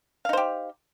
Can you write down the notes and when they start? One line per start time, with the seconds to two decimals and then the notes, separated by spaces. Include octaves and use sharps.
0.25 F5
0.29 D#4
0.33 C5
0.37 G4